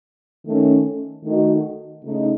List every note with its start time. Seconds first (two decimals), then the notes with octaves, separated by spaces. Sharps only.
0.45 D#3 A3 C#4
1.24 D#3 A3 D#4 F#4
2.03 C#3 A3 D#4